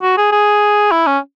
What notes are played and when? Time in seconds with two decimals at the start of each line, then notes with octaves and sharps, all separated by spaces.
0.02 F#4
0.17 G#4
0.32 G#4
0.91 E4
1.07 C#4